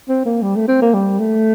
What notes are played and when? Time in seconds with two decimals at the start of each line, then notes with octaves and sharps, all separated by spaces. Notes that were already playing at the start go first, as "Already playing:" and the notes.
0.09 C4
0.25 A#3
0.42 G3
0.56 A3
0.68 C4
0.82 A#3
0.94 G3
1.19 A3